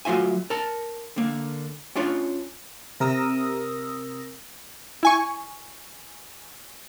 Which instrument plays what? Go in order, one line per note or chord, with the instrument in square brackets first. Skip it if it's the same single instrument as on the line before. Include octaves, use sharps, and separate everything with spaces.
[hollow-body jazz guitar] F#3 A3 F4 E5 G#5
A#4 A5
D3 A#3
C#4 D4 F4 C#5
[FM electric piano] C3 A#4 D#6 E6 A#6
[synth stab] E4 G#5 C#6